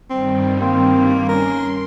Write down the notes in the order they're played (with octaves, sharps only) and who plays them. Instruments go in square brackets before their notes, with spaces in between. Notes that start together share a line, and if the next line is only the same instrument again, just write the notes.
[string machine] G2 D#3 G3 [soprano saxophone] C4
[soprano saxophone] A#3 [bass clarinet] C4
[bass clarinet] C#4 [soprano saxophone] A#4 [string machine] C6